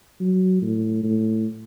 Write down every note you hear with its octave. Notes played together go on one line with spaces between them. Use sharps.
F#3
A2
A2